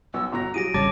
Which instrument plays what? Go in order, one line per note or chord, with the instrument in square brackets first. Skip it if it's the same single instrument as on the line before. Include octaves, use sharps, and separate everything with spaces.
[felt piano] B1 B3 [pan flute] E6
[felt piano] G1 B2 A#6 [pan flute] A#5
[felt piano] F#3 G#4 [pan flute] G4 [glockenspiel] A#6 D7 D#7
[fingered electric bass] G#1 C#3 G3 [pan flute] C#5 [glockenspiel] A5 D6 [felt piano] A6